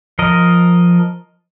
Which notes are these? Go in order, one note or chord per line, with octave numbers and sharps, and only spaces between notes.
F3 A#4 D#5